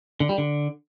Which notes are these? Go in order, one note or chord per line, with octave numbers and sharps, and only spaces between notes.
D3
G3
D3